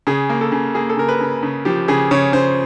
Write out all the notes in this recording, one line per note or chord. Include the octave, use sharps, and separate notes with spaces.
C#3 G#4
A#3
A4
C#3
A#3 G#4
A4
C#3 A#4
B4
C#3
C#3
F3 G4
C#3 G#4
C#3 C#5
C#3 C5